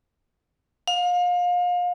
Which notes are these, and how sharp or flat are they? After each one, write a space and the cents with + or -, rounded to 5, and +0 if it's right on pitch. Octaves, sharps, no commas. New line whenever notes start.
F5 +30